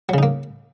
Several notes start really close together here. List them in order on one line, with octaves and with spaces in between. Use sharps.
F#3 C#3 D#4 A#3